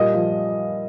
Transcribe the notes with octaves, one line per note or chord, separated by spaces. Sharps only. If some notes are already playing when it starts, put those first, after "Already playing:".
Already playing: A#2 G3 D#5
F3